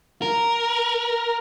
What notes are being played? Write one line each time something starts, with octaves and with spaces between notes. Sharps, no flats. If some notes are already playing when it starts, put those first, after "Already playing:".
A#4